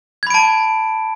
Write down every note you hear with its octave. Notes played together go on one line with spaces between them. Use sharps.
A5 B5 G#6 D7